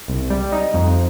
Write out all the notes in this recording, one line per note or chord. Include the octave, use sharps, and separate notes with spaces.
C2
G3
D#4
F2